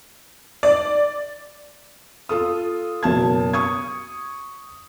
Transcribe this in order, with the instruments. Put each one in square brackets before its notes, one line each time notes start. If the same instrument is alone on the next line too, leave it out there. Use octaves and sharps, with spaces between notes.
[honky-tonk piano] D5
[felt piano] F4 A4 D#6
F#1 B2 A5 G#6
C#6 D#6 G#6